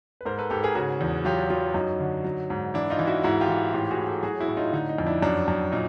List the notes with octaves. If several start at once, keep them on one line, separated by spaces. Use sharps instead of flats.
B4
G#2 A#4 C5
A4 B4
G#2 G4 A4
G#4 A#4
C#3 F#4 G#4
E2
F#3 F4 G4
F#3 F4 G4
F#2 D#4
D3
F#3
G#2
E3 D4 E4
D#4 F4
E3
E4 F#4
G#2 E4 F#4
F4 G4
E3
A2 F4 G4
F#4 G#4
A2
G4 A4
F#3 F#4 G#4
E4 F#4
A2
D#4 F4
D3 D#4
D#4
F2
D4 E4
F#2 D4
F#2
A#2 D#4